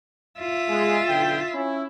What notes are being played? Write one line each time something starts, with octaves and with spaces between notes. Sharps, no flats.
F4 E5
G#3
B1 D3 G5
C#4 E4